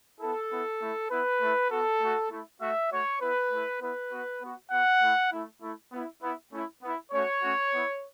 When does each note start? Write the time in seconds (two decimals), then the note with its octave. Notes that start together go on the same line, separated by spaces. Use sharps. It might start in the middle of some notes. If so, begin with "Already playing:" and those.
0.20 B3 E4 A4
0.50 B3 E4
0.80 A3 E4
1.11 B3 E4 B4
1.41 A3 E4
1.71 B3 F#4 A4
2.01 A3 F#4
2.31 A3 E4
2.60 A3 F#4 E5
2.91 A3 F#4 C#5
3.21 B3 E4 B4
3.51 A3 E4
3.81 B3 E4 B4
4.11 B3 F#4
4.41 B3 F#4
4.71 B3 F#4 F#5
5.01 A3 E4
5.32 A3 E4
5.61 A3 E4
5.92 B3 E4
6.22 B3 E4
6.52 A3 C#4 E4
6.82 B3 E4
7.12 A3 C#4 F#4 C#5
7.42 A3 C#4 F#4
7.72 B3 E4